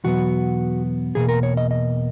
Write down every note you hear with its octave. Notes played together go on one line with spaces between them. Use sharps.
E2 B2 F#3 B3 F#4
E2 B2 A#3 G#4
A#4
C#5
D#5
D#5